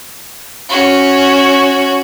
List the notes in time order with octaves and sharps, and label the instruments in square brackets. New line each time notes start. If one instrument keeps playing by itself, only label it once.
[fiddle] C#4 F#4